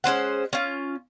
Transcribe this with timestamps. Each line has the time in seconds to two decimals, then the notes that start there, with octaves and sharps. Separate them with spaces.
0.04 G#3 C#4 C5 F#5
0.53 C#4 F4